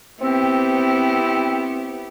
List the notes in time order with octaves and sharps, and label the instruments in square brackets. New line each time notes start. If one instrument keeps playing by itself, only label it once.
[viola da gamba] B3 E4 G4 [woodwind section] C4